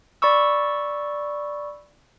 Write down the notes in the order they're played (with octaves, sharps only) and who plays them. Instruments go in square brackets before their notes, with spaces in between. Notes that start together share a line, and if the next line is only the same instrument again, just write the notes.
[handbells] D5 B5 C#6 E6